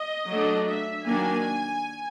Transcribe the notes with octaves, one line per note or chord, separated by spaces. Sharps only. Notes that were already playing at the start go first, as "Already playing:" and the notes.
Already playing: D#5
F#3 A3 D4
E5
D#3 F#3 A#3 D4 G#5